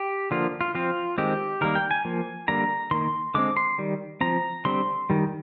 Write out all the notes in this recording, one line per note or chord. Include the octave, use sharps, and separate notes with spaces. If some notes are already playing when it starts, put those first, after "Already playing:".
Already playing: G4
D3 F3 A#3 F4
F4
F3 C4 F4
D#3 G#3 C4 G4
D#3 G3 A#3 A#4
G5
G#5
F3 A#3
D3 G3 A#3 A#5
D#3 A#3 C6
D3 G#3 C4 D6
C6
D#3 G3
F3 C4 A#5
D3 G3 C4 C6
D#3 G3